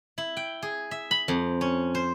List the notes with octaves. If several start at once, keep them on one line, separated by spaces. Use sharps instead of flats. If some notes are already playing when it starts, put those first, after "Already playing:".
E4
G5
G#4
E5
B5
F2
C#4
C5